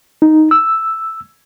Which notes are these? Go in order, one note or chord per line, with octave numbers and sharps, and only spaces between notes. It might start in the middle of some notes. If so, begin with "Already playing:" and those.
D#4
E6